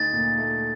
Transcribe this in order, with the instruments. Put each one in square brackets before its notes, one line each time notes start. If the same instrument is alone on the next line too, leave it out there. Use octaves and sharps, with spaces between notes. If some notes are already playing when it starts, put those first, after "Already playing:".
Already playing: [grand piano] D2 D#4 [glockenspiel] A6
[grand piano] A#2
A3